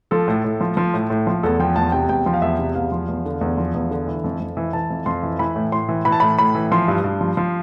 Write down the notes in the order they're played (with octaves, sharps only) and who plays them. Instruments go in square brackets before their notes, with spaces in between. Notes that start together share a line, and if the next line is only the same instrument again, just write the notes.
[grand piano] F3 A4
A2
A2
F3
F3
A2
A2
F3
E2 A4
F3 G5
E2 A5
C3 G5
E2 G5
F3
F5
E2 E5
C3
E2 F5
F3
E2
D3
E2
F3
E2
D3
E3
F2
F2
E3
E3 A5
F2
F2 C6
E3
E3 B5
A2
A2 C6
E3
E3 B5
A5
A2 B5
A2 B5
E3
F3 C6
G2
G2
F3
F3